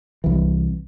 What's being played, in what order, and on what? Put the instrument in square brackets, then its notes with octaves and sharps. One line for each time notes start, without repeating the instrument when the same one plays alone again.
[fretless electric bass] C2 E3